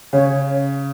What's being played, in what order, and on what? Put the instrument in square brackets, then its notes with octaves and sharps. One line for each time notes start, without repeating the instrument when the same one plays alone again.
[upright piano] C#3 [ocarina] C#5